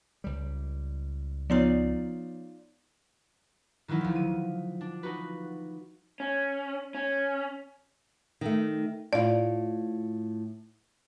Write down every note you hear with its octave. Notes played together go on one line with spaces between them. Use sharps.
C#2 G3
F3 B3 D#4 F4 C#5 D5
D#3 E3 F#3 D#4 E4
D2 F3
D#7
D4
D#4 F#4 B4
C#4
C#4
D#3 A3
A2 F4 D5